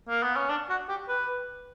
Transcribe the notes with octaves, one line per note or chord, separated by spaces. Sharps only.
A#3
B3
C#4
D4
F#4
G4
B4